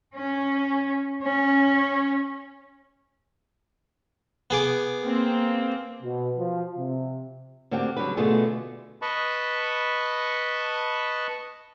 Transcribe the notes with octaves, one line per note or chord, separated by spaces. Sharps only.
C#4
C#4
B3 G#4 D6
A#3 C4
B2
F3
C3
D3 A#3 C4 F#4 G4
C#3 F#3 G3 D4 B4
B2 D3 A3 B3 F4 G#4
B4 D#5 A5 B5 C#6